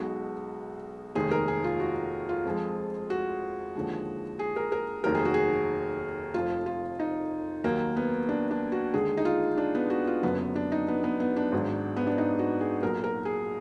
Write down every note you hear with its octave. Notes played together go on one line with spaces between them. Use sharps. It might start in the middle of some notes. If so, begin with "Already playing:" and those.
Already playing: B1 B2 G#3 F#4
F1 D#2 D#3 G#3 G#4
A#4
G#4
F4
F#4
F4
F2 F3 G#3
F#4
D#2 D3 F3 G#3
G#4
A#4
A#4
F1 D#2 D#3 F#3 A#4
G#4
F#4
G#4
F1 F2 F3 F4
F4
D#4
D#2 D#3 F#3 A#3
B3
D4
D4
F#4
D#2 D3 G#3 G#4
D#4
F4
D4
B3
F#4
F4
F#1 F#2 D3 F#3 B3
B3
D4
D#4
B3
B3
B3
D4
G#1 G#2 F#3
B3
D4
D#4
F#4
G#4
B1 A#2 F#3 A#4
A#4
G#4